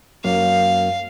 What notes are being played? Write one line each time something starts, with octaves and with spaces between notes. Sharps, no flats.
F#2 F#3 A#3 F5